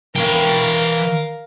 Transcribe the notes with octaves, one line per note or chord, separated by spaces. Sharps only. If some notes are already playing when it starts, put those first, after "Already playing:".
E3 A#4 F5 G5